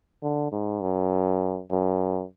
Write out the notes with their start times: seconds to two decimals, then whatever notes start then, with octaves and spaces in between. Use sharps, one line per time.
0.23 D3
0.52 G#2
0.81 F#2
1.70 F#2